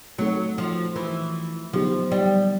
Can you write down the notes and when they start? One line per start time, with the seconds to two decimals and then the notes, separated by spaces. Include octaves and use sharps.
0.19 F#3 A3 C4 D#4 F#4 A4
0.58 F3
0.96 E3
1.73 D3 F3 F#3 B3 D#4 G4
2.12 G3